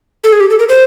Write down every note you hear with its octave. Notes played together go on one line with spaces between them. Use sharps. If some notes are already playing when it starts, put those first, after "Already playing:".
A4
G#4
G4
A4
A#4
C5